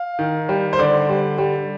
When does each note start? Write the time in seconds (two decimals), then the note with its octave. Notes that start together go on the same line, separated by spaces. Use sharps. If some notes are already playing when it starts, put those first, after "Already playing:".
Already playing: F5
0.19 D#3
0.49 G3
0.73 C5
0.79 D3 D5
1.10 G3
1.38 G3